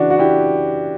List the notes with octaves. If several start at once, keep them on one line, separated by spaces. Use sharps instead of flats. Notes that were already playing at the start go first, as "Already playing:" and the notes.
Already playing: C#3 E3 D4 F#4
F#4
E4 G4